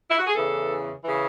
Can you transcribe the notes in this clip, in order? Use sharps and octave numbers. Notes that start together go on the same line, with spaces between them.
E4
F#4
G#4
E2 C#3 E3 A4
C#3 E3